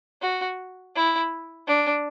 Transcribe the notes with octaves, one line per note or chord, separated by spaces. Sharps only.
F#4
E4
D4